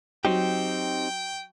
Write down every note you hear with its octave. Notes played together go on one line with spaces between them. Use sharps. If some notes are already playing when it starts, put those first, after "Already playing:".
F#3 C4 D#4 G4 G5